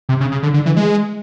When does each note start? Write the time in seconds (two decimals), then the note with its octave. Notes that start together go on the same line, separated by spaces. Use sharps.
0.09 C3
0.20 C#3
0.32 C#3
0.43 D3
0.54 D3
0.66 E3
0.76 G#3